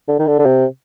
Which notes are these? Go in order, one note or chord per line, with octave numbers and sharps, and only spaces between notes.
D3
D#3
D3
D3
C3